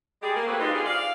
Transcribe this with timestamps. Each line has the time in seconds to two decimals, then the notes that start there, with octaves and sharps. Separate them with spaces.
0.22 G3 G#3 G4 G#4
0.36 A#3
0.47 F#3 A3 C4 B4
0.59 G3 G#3 B3 D#4 F4
0.74 D3 C4 F4 G4 G#4
0.86 D5 F5